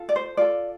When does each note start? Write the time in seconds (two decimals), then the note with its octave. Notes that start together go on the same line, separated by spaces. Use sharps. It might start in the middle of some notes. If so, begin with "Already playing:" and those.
Already playing: F4 A4
0.09 D5
0.16 C5
0.37 F4 A4 D5